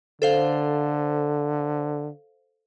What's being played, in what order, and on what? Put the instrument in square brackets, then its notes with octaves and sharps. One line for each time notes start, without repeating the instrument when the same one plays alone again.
[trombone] D3 [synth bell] A4 C5 F5